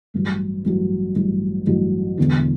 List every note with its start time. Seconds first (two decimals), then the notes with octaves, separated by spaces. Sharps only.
0.14 A1 G2 F#3
0.65 A1 G2 F#3
1.16 A1 G2 F#3
1.67 A1 G2 F#3
2.18 E1 E2 D3